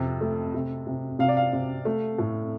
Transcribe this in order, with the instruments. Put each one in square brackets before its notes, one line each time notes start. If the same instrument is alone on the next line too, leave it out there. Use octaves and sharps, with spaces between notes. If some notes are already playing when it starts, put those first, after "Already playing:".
Already playing: [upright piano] F2 C3
A3
C3
C3
C3 F5
D5
F5
C3
A3
A2